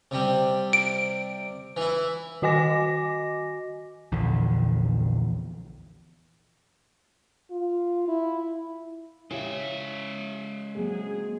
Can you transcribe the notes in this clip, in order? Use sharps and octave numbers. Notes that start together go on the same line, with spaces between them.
C3 G3
D7
E3 E4
D#3 F#4 D#5 G#5 D6 A#6
A#1 E2 D3
F4
E4
C#3 G#3 E4 G4 E5
F#3 A#3 C4 G#4